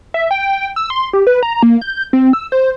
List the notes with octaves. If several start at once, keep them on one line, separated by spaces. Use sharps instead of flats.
E5
G5
E6
C6
G4
B4
A#5
A#3
G6
C4
E6
C5